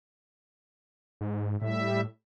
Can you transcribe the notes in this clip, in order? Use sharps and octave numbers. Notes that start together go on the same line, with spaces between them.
G#2
A2 G3 E5